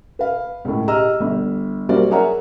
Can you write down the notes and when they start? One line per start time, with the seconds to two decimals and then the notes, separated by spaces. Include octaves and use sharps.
0.19 B4 F5
0.65 C#2 A2
0.88 G4 G#4 D#5 A#5 E6 F6
1.20 G1
1.89 F#3 G3 A#3 F#4 C5 D5
2.11 G#4 A#4 C#5 E5 F#5 A#5